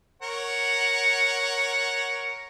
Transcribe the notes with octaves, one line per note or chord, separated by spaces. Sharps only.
A#4 C#5 F#5